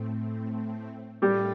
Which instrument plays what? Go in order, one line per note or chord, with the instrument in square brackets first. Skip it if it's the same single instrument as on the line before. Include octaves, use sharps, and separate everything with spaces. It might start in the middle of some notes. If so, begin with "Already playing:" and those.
Already playing: [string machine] A2 A3 C4
[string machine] A2 A3 D4 F4 A4 [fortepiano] G3 G4